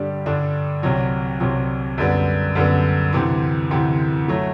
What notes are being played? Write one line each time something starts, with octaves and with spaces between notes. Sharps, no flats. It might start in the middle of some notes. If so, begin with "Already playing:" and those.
Already playing: G2 D3 G3 D4 G4
G2 D3 G3 D4 G4
C2 C3 F#3
C2 C3 F#3
F#2 D3 G3 B3
F#2 D3 G3 B3
D2 C3 E3
D2 C3 E3
F#3 A3